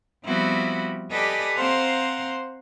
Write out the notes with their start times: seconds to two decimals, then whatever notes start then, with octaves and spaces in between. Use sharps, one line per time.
0.25 F3 G3 B3 C4 E4 F#4
1.11 G4 A4 B4 D5 D#5 G#5
1.57 C4 C5 F5 F#5 A#5 C6